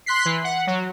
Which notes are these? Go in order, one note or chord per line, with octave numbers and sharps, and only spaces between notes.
C6 F#6 B6 C7
E3
F#5
F#3